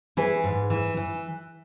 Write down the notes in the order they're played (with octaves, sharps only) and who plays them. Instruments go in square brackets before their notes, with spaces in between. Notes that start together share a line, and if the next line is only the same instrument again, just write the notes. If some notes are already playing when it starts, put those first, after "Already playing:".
[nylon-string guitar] E3 G#4 B4
G#2
E3
E3